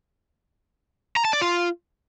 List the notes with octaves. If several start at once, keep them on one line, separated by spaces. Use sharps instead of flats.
A#5
A5
D5
F4